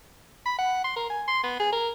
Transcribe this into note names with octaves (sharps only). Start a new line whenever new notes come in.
B5
F#5
C6
A#4
G#5
C6
B3
G#4
A#4